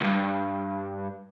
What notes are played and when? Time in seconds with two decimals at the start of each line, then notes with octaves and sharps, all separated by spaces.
0.01 C#2 G2